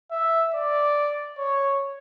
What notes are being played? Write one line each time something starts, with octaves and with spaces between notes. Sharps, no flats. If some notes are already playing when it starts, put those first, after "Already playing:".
E5
D5
C#5